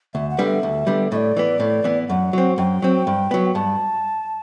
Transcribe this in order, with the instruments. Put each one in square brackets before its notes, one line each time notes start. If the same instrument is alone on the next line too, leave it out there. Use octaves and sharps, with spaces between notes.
[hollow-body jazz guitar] D2 [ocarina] E5
[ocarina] F#5
[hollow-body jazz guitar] D3 G3 B3
[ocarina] E5
[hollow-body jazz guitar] D2
D3 G3 B3
[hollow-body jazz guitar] A2 [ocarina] D5 E5
[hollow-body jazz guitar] E3 B3
A2
E3 B3
[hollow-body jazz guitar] F#2 [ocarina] F#5
[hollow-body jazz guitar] F#3 C4
[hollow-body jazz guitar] F#2 [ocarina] G5
[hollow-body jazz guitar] F#3 C4
G2
F#3 B3
[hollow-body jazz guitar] G2 [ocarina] A5